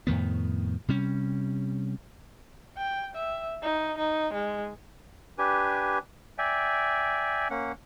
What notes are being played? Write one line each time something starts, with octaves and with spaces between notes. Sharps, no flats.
F2 A2 D#3 B3
C3 G3 C#4
G5
E5
D#4
D#4
G#3
D4 G4 B4 G#5
D5 E5 G5 G#5
A#3 C#4 F#5